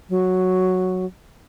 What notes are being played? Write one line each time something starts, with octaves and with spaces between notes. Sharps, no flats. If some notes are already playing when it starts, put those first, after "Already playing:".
F#3